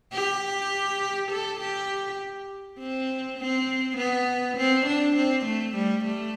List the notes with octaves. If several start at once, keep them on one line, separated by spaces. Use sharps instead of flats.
G4
A4
G4
C4
C4
B3
C4
D4
C4
A3
G3
A3